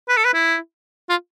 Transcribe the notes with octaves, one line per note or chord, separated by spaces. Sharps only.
B4
A4
B4
E4
F4